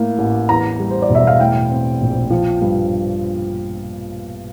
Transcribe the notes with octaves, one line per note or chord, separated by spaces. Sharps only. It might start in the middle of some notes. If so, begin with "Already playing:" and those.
Already playing: A2 A#3
A1
E2 A#5
G3
C5
D5
E1
E5
F5
A2 G5
C4
A#1
F3
G2